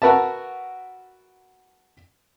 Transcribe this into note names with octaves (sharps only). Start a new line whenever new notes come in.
F#4 A#4 B4 E5 A5